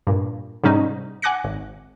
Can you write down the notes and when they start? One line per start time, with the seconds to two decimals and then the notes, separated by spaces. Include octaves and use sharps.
0.07 G2 A#2
0.63 G#2 C3 G3 C#4 D#4
1.22 F#5 G#5 D6 F#6 A#6 C#7
1.44 G#1